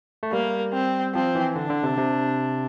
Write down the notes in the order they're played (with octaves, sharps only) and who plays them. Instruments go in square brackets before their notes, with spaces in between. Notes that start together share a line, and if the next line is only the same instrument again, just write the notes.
[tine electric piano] A3
[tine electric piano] G3 [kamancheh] A#3
[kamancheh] C4
[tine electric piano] F3 [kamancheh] C4
[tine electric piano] E3
[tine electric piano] D3 [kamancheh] D4
[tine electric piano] D3
C3
C3